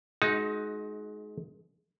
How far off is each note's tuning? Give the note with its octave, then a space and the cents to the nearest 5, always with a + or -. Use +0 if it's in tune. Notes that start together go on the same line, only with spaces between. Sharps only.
G#3 +25 D#4 +5 F#4 +0